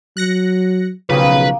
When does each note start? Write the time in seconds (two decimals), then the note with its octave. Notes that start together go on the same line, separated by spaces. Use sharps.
0.17 F#3 F#6 A#6 C#7
1.10 B1 C#3 F3 A#3 B4 G5 D#6